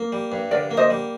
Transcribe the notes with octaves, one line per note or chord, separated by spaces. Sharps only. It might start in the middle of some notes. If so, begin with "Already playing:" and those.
Already playing: A#3
G3
G2
D3 A#4 D5
A#3
C5 D#5
G3